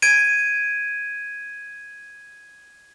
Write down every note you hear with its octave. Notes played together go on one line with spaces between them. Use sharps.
G#6 D7 D#7